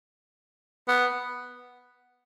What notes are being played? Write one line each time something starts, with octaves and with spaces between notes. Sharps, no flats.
B3